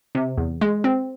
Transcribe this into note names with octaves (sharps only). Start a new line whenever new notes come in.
C3
E2
G#3
C4